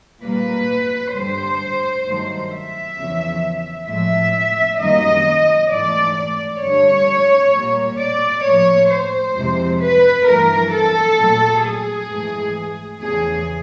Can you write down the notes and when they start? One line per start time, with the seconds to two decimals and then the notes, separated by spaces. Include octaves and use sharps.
0.22 A#2 G3 A#3 B4
1.14 G2 D3 G3 C5
2.05 G2 D#3 F#3 A3
2.50 E5
2.96 E2 C#3 F3
3.87 A2 F3 G#3 E5
4.79 F#2 D#3 G3 A#3 D#5
5.70 G#2 E3 A3 D5
6.16 D5
6.61 G2 D3 G3 C#5
7.52 A#2 G3 A#3
7.98 D5
8.43 A2 F3 A#3 C#5
8.90 C5
9.35 F2 C3 E3 G#3
9.81 B4
10.26 G2 E3 A3 A#4
10.72 A4
11.18 A#2 F#3 A3
11.63 G#4
12.09 G#2 E3 A3
13.00 E2 C#3 E3 A3 G#4